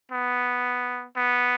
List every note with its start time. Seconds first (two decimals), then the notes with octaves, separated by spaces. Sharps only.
0.11 B3
1.16 B3